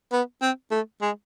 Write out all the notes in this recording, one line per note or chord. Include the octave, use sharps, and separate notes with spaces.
B3
C4
A3
G#3